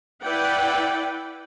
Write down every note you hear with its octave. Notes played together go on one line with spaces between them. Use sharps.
E4 B4 D5 F#5 G5